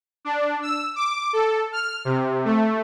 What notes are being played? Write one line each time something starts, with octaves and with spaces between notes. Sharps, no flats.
D4
E6
D6
A4
F6
C3
A3